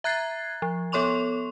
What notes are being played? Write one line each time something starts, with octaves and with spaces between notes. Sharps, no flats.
E5 A#5 F#6 G#6 A6 C7
F3
B3 A4 C#5 C6 C#6 F7